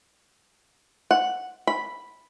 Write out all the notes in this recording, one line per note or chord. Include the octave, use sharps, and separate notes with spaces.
F#5
B5